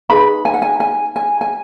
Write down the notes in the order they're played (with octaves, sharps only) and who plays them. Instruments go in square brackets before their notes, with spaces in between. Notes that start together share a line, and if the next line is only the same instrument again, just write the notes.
[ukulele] D#4 G#4 B4 B5
G#5
F#5
G#5
G#5
G#5
G#5